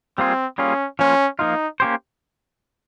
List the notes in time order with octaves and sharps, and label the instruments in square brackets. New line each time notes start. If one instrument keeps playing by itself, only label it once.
[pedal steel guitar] G3 A#3 F4 G#4 [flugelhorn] C4
[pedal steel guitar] G3 A#3 F4 G#4 [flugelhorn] C#4
[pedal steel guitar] F3 A#3 F4 [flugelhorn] C#4
[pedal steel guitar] F3 A#3 F4 [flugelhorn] D#4
[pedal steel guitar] A#3 C#4 G4 C5